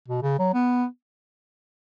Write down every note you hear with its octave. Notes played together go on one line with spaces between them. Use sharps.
B2
C#3
F#3
B3